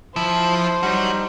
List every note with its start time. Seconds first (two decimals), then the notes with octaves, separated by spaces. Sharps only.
0.16 F3 E4 C5
0.83 G3 D#4 F#4 C#5